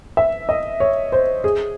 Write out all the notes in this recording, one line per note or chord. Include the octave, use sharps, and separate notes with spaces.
E5
D#5
C#5
C5
G#4